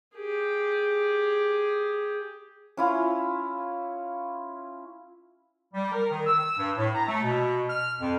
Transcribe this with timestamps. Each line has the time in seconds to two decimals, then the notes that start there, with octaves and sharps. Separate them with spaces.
0.16 G4 G#4
2.77 C#4 E4 F4
5.74 G3
5.92 A#4
6.11 D#3
6.26 E6
6.58 G2
6.77 A2
6.94 A#5
7.08 A3
7.23 B2
7.70 F6
8.00 F2